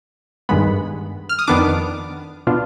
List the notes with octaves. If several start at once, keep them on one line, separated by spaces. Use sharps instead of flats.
G2 D#3 G#3 B3 B5
F6
D#6
F2 D#3 B3 D4 D6
B2 B3 D4 F4